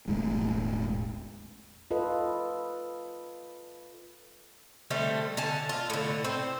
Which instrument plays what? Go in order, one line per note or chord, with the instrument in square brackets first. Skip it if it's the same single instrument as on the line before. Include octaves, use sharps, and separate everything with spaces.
[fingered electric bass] E1 A1 A2 G#3
[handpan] F4 A4 B4 D#5
[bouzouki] D3 G3 A3 C4
D3 G#5 A5
F4
A2 D3
C4 C5